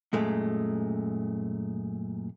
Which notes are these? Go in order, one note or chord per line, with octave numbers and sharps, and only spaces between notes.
F#2 A#2 G#3 A3